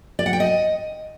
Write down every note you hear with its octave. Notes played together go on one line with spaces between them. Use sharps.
D5
F#5
G5
D#5